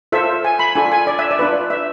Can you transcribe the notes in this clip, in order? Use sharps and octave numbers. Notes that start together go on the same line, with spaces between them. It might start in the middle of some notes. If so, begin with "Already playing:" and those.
F4 A4 C5 E5
G#5
B5
D4 F4 A4 G#5
G#5
D5
E5
D5
D4 F4 B4
E5